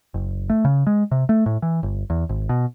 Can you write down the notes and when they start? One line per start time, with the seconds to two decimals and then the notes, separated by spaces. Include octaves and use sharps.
0.14 F#1
0.50 A3
0.65 C#3
0.87 G#3
1.12 C3
1.29 A3
1.46 A2
1.62 E3
1.83 G1
2.10 E2
2.29 G#1
2.49 B2